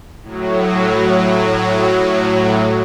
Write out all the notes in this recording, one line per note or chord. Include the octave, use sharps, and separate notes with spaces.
A2 F#3